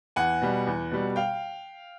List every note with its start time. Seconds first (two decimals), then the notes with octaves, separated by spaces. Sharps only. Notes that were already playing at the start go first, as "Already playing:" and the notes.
0.16 E2 F#5 G#5
0.42 B2 G3
0.67 E2
0.92 B2 G3
1.16 F5 G5